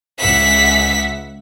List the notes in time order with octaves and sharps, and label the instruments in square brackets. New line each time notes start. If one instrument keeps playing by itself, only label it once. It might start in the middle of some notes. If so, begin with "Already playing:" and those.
[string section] C#2 E5 F#5 [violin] B6